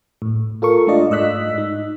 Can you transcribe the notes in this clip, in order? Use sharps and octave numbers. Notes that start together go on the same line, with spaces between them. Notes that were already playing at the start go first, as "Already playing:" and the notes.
A2
F4 A4 A#4 C#6
G#3 A3 D4 F4 D5 D#5
G#2 D#5 E6 F#6 B6
D#4